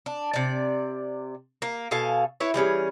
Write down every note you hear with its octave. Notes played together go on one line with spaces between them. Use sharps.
D4
C3 D5
A#3
B2 A4 F5 G#5
E4 B4 C#5
E3 G3 C#4 G#4